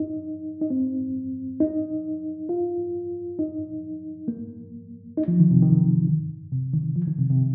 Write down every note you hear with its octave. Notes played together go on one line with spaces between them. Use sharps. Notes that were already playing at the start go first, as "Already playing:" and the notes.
Already playing: D#4
D#4
C4
D#4
F4
D#4
A#3
D#4
F3
D#3
C3
D#3
C3
D#3
F3
D#3
C3
C3